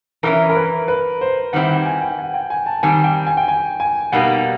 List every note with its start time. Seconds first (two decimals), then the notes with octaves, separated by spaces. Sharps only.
0.23 E3 G3 A#3 C#4 E4 A#4
0.50 A#4
0.56 B4
0.88 B4
1.21 C5
1.53 D#3 G3 C4 E4 F#5
1.69 F#5
1.86 G#5
2.01 G5
2.19 F#5
2.34 G5
2.50 G#5
2.66 A5
2.83 D#3 G3 C4 G#5
3.04 G5
3.27 G#5
3.37 G5
3.48 G#5
3.80 G#5
4.12 B2 G3 A#3 D#4 F#5